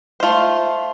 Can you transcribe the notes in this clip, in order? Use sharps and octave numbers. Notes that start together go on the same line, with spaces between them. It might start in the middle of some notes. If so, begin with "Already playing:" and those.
A3 F4 C5